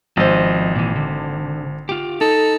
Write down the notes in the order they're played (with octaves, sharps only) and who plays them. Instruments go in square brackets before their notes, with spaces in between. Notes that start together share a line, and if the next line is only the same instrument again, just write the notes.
[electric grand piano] G#1 C5 [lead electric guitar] F3 D#5
[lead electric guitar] A#2 E3
D3
F4 G4
[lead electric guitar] D#4 [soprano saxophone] A4